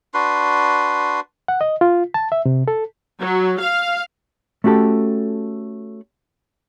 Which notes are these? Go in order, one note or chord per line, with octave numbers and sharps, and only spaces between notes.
D4 F#4 B4 C6
F#5
D#5
F4
A5
E5
C3
A4
F#3
F5
A3 C#4 F#4 G4 A4